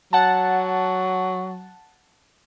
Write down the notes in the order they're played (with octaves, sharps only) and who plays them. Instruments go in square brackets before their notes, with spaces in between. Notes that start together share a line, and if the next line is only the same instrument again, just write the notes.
[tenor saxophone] F#3 [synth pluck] F#5 A5